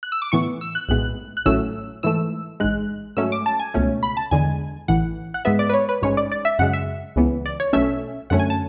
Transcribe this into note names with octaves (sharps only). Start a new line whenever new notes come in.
F#6
E6
D6
A2 E3 B3 C#6
E6
F#6
B1 A2 G#3 B3 F#6
F#6
A1 A2 F#3 A3 C#4 E6
G#2 E3 A3 E6
A1 G#2 G#3 F#6
G#2 F#3 A3 C#4 E6
D6
A5
G#5
C#2 B2 A3 C#4
B5
A5
E2 D3 G#3 G#5
A1 A2 E3 F#5
F#5
G#2 G#3 B3 E5
D5
B4
C#5
B4
A1 G#2 G#3 C#4 C#5
D5
D5
E5
F#2 C#3 G#3 F#5
E5
C#2 C#3 E3 B3
D5
C#5
B1 B2 A3 C#4 E5
F#2 D3 A3 C#4 F#5
G#5
A5